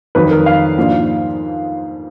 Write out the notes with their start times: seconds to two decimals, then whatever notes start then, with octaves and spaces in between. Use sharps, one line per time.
0.15 F2 D#3 F#3 B4
0.31 A#4
0.46 F5
0.78 G#2 F3 A#3 D4